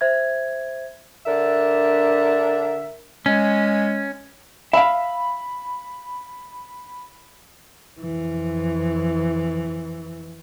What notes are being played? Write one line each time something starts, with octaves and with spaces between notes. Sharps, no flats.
C5 E5 G#6
D3 D4 A#4 E5
G#3 C#4
E5 F5 B5
F2 E3